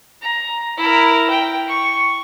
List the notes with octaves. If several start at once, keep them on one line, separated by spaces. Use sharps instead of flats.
A#5
E4 A#4
G5
C#6